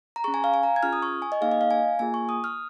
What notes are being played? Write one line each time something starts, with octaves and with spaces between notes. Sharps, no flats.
A#5
C#4 G#4 C#6
G#5
F5
G#5
A#5
G#6
C#4 F4 G#4 F6
D#6
C#6
G#5
D#5
A#3 D#4 G#4 F5
D#5
F5
G#5
A#3 F4 G#4 G#5
C#6
D#6
F6